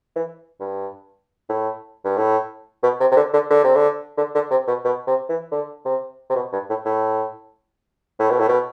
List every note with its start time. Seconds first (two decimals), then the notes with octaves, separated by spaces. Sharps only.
0.16 E3
0.60 G2
1.49 A2
2.05 G2
2.17 A2
2.83 B2
3.00 C3
3.11 C3
3.17 D3
3.33 D3
3.50 D3
3.64 C3
3.75 D3
4.18 D3
4.35 D3
4.51 C3
4.68 B2
4.85 B2
5.07 C3
5.29 E3
5.51 D3
5.85 C3
6.30 C3
6.36 B2
6.53 G2
6.69 A2
6.85 A2
8.20 A2
8.30 B2
8.39 A2
8.49 B2